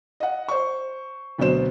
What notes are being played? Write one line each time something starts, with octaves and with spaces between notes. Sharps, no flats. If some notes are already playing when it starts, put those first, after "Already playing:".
D#5 F#5
C5 C#6
D2 B2 F#3 C5 E7